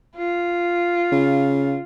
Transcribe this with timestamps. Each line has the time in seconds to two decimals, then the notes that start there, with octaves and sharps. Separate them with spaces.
0.16 F4
1.12 C#3